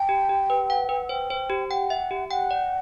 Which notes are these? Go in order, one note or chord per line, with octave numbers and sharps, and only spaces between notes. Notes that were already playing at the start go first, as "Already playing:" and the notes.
Already playing: G5 A5
G4
G4
B4
F#5
B4
C5 G5
C5
G4
F#5 G5
E5
G4
F#5 G5
D5